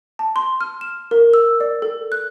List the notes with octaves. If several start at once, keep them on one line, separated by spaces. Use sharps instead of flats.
A5
C6
F6
E7
A#4
E6
D5
A4
F#6